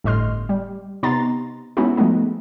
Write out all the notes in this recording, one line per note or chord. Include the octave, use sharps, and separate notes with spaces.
G1 A2 D#5 C6 F6
G3
C3 B3 D#4 A#5 C6 A6
G#3 B3 C#4 D#4 E4 F#4
F3 G#3 A3 B3 D#4